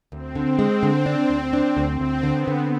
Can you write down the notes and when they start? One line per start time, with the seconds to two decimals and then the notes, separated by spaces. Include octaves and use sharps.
0.12 D2 C4
0.35 D3
0.59 G#3
0.83 D3
1.06 D4
1.29 D2
1.53 D4
1.77 D2
2.00 D2 C4
2.23 D3
2.31 B3
2.47 D3